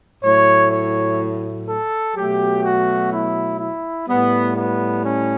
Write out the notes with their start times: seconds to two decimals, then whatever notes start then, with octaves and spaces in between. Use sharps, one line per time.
0.23 A2 F#3 A3 C#5
0.71 C#5
1.68 A4
2.16 B2 F#3 A3 G4
2.63 F#4
3.12 E4
3.60 E4
4.08 A2 G3 B3
4.56 B3
5.04 C#4